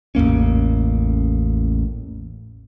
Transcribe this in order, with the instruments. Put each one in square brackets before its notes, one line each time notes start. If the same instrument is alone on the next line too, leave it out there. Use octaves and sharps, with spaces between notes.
[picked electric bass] A1 E2 A#3 C#4